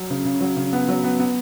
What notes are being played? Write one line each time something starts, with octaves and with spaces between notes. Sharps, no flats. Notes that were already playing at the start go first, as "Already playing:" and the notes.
Already playing: F#3
C#3
C#3
F#3
C#3
B3
F#3
B3
B3